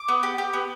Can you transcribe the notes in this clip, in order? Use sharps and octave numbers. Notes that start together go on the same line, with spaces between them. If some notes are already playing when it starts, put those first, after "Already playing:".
Already playing: D6
B3
G4
G4
B3